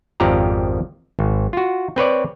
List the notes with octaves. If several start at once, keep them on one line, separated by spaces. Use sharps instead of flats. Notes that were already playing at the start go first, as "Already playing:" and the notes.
G#1 F2 F3 G4 D5 A#5
G#1
F4 F#4
C4 B4 C#5 D5